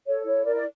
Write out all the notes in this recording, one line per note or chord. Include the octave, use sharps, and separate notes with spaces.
A4 C#5
E4 C#5
A#4 D5
D5